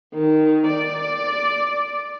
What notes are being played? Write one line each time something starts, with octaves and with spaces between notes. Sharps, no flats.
D#3
D5